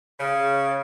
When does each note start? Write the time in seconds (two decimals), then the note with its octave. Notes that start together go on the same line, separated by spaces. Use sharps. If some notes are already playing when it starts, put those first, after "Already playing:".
0.17 C#3